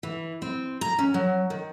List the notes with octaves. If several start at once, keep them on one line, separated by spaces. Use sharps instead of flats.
E3
C4
A#5
C#4
F#3
D#3